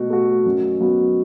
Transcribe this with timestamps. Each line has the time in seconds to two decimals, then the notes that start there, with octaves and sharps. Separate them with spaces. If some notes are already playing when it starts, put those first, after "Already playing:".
Already playing: B2 A3 F#4
0.10 A3 F#4
0.45 F#2
0.80 F#3 B3 F#4